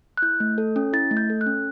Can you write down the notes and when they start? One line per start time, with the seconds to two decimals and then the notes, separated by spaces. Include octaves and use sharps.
0.17 F#6
0.22 E4 G6
0.40 A3
0.58 A4
0.76 C#4
0.93 E4 A6
1.11 A3
1.17 G6
1.30 A4
1.41 F#6
1.46 C#4